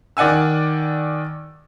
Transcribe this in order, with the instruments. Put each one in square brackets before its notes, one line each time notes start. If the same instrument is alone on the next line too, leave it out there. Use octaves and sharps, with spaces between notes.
[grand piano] D#3 D5 F#5 G#5 E6